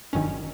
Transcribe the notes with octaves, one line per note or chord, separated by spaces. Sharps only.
G1 F#2 D#3 C#4